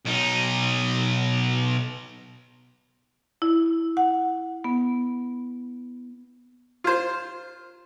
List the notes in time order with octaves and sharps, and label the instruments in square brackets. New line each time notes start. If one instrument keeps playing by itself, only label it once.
[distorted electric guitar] B1 D#4
[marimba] E4
F#5
B3
[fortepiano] F4 C5